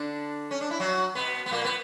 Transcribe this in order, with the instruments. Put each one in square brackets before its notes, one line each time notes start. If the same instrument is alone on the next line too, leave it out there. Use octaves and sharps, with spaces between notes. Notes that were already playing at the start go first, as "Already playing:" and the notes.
Already playing: [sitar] D3 D4
C#4
D4
E4
F#3 F#4
B2 B3
B3
A#2 A#3
B3